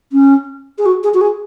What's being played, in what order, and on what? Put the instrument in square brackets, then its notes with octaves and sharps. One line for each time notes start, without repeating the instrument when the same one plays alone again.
[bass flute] C#4
G#4
F#4
G#4
F#4
G#4